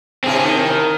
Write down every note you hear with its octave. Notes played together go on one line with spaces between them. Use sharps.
G2 C3 C4 E4 G#4
D#3